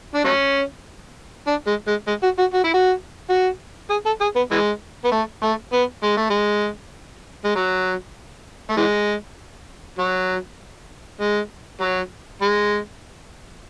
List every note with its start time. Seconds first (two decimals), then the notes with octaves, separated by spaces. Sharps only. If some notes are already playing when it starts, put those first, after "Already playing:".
0.15 D4
0.25 F#3 A3 C#4
1.47 D4
1.67 G#3
1.87 G#3
2.08 G#3
2.23 F#4
2.39 F#4
2.54 F#4
2.64 E4
2.74 F#4
3.30 F#4
3.90 G#4
4.06 A4
4.21 G#4
4.36 B3
4.51 E3 G#3
5.05 B3
5.12 A3
5.42 A3
5.73 B3
6.03 G#3
6.17 A3
6.30 G#3
7.44 G#3
7.56 F#3
8.70 A3
8.77 E3 G#3
9.99 F#3
11.20 G#3
11.81 F#3
12.42 G#3